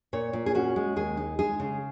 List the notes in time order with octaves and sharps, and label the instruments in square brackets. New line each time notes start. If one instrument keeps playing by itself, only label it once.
[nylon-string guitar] A#2 C#5
A#2
G#4
C#4 F#4
G#3
D#2 G#4
D#4
G#3 G#4
C#3